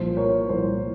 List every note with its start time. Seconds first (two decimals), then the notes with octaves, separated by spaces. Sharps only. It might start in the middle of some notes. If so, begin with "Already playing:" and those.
Already playing: C2 A#2 F3 C5
0.17 A#4 C#5
0.49 C2 A#2 F3 C5